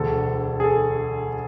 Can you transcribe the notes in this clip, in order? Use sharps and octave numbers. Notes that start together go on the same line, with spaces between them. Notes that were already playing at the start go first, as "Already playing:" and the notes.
Already playing: E1 D2 D3 A4
G#4
A4